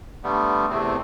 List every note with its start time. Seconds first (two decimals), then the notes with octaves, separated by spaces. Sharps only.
0.24 D3 G3 A3 B3
0.69 E2 C3 A3 C4